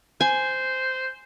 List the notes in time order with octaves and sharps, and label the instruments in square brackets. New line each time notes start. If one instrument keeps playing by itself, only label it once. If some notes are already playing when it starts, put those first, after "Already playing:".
[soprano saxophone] C5 [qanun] G#5